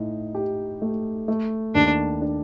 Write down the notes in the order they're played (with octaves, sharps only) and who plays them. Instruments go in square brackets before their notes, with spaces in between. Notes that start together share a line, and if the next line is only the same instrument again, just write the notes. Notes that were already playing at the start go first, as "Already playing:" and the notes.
Already playing: [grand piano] A2 D#4
G4
A3
A3
[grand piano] D#2 [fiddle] D4
[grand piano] D4